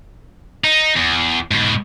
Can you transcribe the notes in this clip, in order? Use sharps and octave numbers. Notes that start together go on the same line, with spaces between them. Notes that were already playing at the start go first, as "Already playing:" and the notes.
D#4
E2
G#2 B2